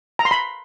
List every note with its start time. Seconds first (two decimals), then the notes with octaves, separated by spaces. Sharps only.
0.19 A#5
0.25 C6
0.31 B5